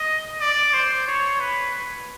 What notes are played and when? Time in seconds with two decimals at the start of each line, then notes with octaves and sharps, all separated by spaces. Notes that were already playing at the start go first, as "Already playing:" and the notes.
Already playing: D#5
0.40 D5
0.73 C5
1.07 C#5
1.40 B4